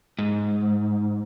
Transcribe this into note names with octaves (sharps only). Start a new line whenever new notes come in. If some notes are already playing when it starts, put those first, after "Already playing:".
G#2